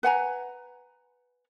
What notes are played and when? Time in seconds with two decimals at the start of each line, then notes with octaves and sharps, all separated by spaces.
0.03 B4 F#5 G#5 A#5